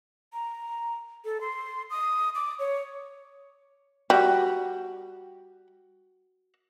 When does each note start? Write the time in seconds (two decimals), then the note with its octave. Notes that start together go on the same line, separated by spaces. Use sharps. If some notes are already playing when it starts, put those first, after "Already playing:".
0.33 A#5
1.25 A4
1.41 C6
1.90 D#6
2.35 D6
2.59 C#5
4.10 G3 F#4